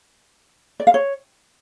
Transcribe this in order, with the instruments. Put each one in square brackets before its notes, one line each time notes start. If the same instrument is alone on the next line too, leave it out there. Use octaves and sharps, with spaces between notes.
[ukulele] D5
F5
C#5